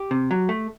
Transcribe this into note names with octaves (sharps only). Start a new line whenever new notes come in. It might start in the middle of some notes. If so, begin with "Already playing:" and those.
Already playing: G4
C3
F#3
A3